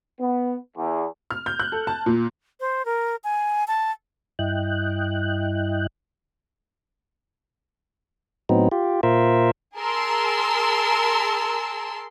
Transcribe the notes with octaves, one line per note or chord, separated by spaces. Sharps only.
B3
E2
F6
G6
F#6
A4
A5
A#2
C5
A#4
G#5
A5
G2 E4 D#5 G5 F#6
A2 F#3 B3 C4 D#4
F4 G4
A#2 F4 A#4 C5 E5
G#4 A#4 A5 C6 E6